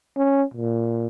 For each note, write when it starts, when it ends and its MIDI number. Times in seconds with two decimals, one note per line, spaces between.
0.17 0.43 61
0.54 1.07 46